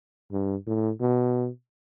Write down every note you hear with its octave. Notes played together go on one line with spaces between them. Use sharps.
G2
A2
B2